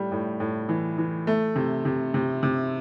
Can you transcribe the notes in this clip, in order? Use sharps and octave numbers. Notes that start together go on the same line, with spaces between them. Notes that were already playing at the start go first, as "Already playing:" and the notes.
Already playing: A2 G3
A2
A2
E3
E3
A3
C3
C3
C3
C3